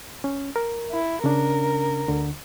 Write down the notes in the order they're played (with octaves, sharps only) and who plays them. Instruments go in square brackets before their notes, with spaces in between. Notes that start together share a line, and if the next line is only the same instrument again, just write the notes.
[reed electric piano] C#4
A#4
[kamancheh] E4
[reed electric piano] C#3 C#4 D4 [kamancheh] A#4
[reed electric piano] D2 D3